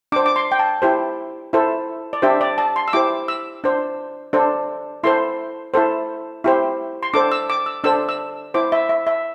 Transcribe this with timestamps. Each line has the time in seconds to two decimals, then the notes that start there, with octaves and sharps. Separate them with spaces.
0.12 D4 D6
0.16 C5
0.26 D6
0.36 C6
0.52 G5
0.59 A5
0.82 E4 G4 C5
1.53 E4 A4 C5
2.13 D5
2.22 D4 G4 C5 E5
2.41 D5
2.58 A5
2.76 C6
2.88 E6
2.93 E4 G4 C5 D6
3.28 E6
3.64 D4 C5
4.33 D4 A4 C5
5.03 E4 A4 C5 C6
5.74 E4 A4 C5
6.44 E4 G4 C5
7.03 C6
7.14 D4 A4 C5 D6
7.32 E6
7.50 D6
7.66 E6
7.84 D4 A4 C5 E6
8.09 E6
8.54 E4 C5 D6
8.72 E5
8.89 E5
9.07 E5